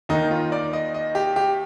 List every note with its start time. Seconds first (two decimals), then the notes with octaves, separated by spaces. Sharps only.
0.09 D#2 D#3 D#4
0.31 F4
0.52 D5
0.73 D#5
0.94 D#5
1.15 G4
1.36 G4